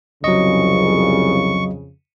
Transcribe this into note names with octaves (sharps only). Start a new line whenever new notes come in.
C2 F2 C#3 F#3 D#5 C#6